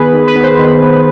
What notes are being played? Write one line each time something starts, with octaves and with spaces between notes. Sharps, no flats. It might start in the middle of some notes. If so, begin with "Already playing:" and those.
Already playing: D#3 B3 G#4 B4
D#3
B4
B3
C5
D#3
B3